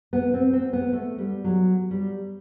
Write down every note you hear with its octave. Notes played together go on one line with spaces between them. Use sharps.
B3
C4
C4
B3
A3
G3
F#3
G3